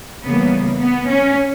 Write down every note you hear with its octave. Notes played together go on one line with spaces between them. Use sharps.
C#3 E3 G3 A#3 B3
B3
C#4